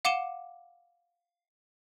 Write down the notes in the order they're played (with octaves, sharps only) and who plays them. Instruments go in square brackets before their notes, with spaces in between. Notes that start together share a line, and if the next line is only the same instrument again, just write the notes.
[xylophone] F5 F#5 D6 D#7 E7 G7